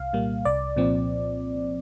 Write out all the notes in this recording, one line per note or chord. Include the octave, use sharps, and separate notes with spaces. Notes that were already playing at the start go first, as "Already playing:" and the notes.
Already playing: C2 F5
A#2 G3 A#3
C2 D5
A#2 F3 C4